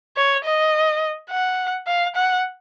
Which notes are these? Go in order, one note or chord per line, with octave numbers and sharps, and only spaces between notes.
C#5
D#5
F#5
F5
F#5